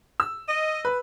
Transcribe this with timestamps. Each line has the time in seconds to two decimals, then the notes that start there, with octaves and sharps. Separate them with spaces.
0.20 E6
0.49 D#5
0.85 B4